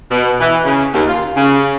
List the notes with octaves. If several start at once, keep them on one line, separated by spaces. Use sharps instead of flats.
B2
E3
C#3
D#2
F4
C#3